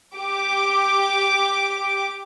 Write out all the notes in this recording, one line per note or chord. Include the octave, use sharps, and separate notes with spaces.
G4 D6